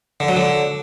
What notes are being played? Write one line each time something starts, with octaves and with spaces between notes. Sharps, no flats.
D3
F#3
D3